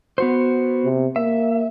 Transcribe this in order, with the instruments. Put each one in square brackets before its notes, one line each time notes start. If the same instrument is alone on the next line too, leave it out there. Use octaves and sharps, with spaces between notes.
[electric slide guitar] B3 F#4 C5
[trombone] C3
[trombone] A#3 [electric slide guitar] E5